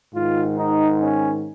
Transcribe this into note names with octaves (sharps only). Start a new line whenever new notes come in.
G#2 D#3 F4
D#4
C#4